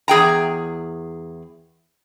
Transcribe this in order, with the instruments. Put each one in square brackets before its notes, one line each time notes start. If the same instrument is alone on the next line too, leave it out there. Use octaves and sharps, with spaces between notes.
[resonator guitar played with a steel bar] E2 G#4 G5 A#5